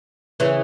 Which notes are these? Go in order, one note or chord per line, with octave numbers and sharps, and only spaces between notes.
C#3 E3